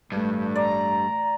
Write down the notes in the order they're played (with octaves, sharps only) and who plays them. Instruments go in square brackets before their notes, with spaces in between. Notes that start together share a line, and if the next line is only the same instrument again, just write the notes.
[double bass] A1 A3 [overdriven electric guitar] G2
[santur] D5 [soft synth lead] A#5